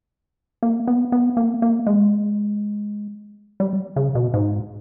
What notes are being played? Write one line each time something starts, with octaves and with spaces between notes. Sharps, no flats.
A#3
B3
B3
A#3
A#3
G#3
G3
C#3
B2
G#2